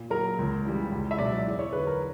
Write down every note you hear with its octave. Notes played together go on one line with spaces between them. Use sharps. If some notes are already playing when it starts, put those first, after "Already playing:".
Already playing: A#2
F#3 A#4
C#2
C#3 E3 G3
C#2
E5
B2 F#3 D5
E2
C#5
D3 F#3 B4
A#4